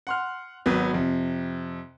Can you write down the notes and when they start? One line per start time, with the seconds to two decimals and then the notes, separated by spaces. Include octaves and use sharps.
0.07 F#5 C6 F6
0.66 G#1 F#3 B3
0.94 F2 C3